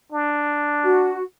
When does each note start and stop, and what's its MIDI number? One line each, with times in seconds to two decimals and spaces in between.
0.12 1.22 62
0.83 1.23 66